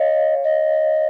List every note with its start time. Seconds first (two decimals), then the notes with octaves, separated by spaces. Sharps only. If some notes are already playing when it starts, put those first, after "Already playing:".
Already playing: C#5 D#5 F5
0.44 D#5